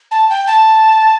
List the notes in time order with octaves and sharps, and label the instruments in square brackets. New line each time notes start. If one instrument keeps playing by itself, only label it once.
[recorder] A5
G5
A5